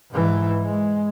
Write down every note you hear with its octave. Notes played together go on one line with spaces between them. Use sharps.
G#2 E3
G#3